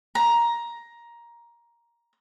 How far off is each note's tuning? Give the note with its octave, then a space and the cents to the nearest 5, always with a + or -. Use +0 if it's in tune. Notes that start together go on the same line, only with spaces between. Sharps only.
A#5 +10